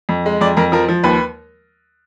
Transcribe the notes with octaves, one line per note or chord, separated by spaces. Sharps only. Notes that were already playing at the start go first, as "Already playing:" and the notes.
F2
G#3
F2 D5
F2 A#4
F3 A#4
F3
D#2 B4